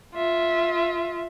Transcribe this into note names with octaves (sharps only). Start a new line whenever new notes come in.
F4 E5